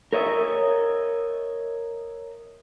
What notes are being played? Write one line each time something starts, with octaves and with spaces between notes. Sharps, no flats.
A#4 C#5 D#5 E5